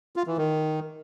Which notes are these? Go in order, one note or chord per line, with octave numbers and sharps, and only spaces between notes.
F4
E3
D#3